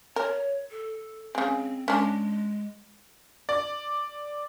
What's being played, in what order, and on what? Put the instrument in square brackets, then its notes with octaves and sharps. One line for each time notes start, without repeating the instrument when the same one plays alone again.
[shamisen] A#4 [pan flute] C#5
[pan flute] A4
[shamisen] C#3 G#3 [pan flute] C4
[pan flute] G#3 [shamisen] C#4 D4
[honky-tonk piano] D5